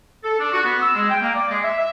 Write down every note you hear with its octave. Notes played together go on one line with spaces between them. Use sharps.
A4
D4
F#4
B3
E6
G#3
G5
A#3
D5
G#3
E5
E5